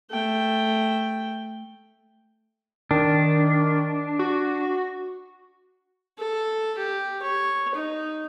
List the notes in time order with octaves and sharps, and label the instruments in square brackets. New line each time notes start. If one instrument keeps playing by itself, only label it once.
[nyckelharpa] A3 G5
[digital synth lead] D#3 [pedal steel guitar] D4
[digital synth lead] F#4
[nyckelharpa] A4
G4
C#5
D#4